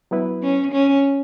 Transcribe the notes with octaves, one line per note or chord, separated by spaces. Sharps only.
F#3 B3 E4 B4
C#4
C#4